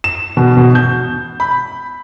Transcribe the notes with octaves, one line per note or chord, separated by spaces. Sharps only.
E7
B2
B2
G6
B5